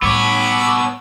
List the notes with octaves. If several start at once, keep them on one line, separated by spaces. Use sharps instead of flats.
A2 G3 B3 C#5 B5 D6 E6